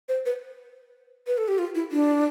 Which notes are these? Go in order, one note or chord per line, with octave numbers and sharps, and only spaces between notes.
C5
B4
B4
A4
G4
F4
E4
D4